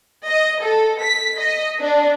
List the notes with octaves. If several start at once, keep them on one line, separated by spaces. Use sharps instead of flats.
D#5
A4
B6
D#5
D4